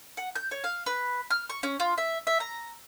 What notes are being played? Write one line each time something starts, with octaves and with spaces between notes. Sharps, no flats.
F#5
G6
C#5
F5
B4
F6
C#6
C#4
F4
E5
E5
A#5